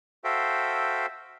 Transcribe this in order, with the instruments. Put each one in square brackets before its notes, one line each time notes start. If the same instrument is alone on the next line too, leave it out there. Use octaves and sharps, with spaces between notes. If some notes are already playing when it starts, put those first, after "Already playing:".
[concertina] F#4 A4 C5 E5 F5 G5